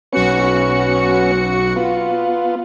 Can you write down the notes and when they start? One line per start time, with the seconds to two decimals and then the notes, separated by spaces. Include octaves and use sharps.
0.13 B1 B3 C#4 F#4 C#7
1.76 B3 F4